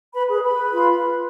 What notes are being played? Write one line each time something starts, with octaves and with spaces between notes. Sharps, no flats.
B4 B5
G#4 B4
B4 B5
F4